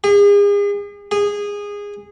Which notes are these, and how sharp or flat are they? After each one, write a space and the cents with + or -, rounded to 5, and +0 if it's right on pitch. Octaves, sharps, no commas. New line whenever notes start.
G#4 -40
G#4 -20